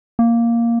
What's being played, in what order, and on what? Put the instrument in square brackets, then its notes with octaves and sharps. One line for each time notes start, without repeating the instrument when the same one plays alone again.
[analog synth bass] A#3